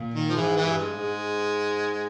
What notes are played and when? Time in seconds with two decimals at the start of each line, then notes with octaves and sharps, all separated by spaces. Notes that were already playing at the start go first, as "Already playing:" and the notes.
Already playing: A#2
0.14 D#3
0.29 F3
0.35 G#2 E3
0.56 E3
0.67 G2
0.77 G#3
0.99 G#2